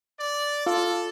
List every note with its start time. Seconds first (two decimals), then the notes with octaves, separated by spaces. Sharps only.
0.19 D5
0.66 F4 A4